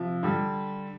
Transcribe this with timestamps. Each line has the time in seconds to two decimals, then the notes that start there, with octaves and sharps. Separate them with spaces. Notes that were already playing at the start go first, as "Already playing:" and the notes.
Already playing: C3 F3
0.23 D3 G3